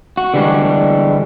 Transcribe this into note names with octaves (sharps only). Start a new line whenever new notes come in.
F#4
D3 E3 G3 G#3 D4